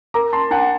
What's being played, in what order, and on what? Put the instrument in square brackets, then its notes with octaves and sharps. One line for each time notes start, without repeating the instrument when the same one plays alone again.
[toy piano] A#4 [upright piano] A#5 D6
[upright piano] A5 C6
[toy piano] D4 [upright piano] F#5 A5